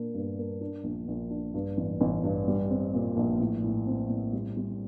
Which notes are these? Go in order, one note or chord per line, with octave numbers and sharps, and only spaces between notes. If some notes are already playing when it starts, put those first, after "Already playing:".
Already playing: A#2 A#3 D4
G2
A#3
D4
A#1
A#1
D4
G2
A1
A1
G2
G3
C4
A#2
A#1
A2
A2
C4
A2
G3
G3